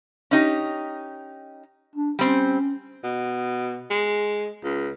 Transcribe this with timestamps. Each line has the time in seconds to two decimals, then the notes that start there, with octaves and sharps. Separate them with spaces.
0.31 C#4 D#4 G4
1.96 D4
2.19 G3 C4 C#4
3.04 B2
3.91 G#3
4.64 C#2